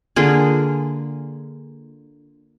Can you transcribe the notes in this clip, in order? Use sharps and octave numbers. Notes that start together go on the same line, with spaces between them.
D3 A#3 F4 G#4